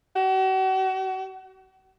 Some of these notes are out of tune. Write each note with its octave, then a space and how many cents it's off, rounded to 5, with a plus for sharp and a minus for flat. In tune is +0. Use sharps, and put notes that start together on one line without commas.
F#4 +40